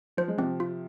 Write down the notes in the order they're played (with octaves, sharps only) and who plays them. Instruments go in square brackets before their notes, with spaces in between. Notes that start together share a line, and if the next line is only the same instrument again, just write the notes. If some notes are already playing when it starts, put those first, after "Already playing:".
[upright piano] F3 [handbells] C5
[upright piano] G#3
[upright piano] C3 F3 [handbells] C4
[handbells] F4